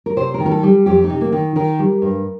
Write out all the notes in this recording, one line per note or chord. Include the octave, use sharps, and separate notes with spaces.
A#4
C3 C5
A#4
D#3
A#4
A4
G3
F2 G4
D#4
C3
A#3
D#3
D#3 A#4
G3
G2